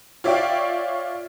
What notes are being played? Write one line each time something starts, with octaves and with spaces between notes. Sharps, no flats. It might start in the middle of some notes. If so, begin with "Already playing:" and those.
F4 C#5 D5 E5 F5 G5